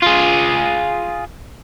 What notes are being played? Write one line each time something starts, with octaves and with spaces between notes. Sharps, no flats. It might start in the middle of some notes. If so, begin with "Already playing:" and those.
F4 G#4